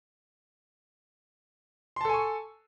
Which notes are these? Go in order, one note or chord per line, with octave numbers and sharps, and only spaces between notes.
A4 G#5 A5 C6 C#6